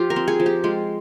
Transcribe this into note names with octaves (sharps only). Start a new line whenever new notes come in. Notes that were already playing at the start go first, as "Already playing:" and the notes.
Already playing: F3 F4 G4
A#4
C4
G#4
F3
G4
G#3 F4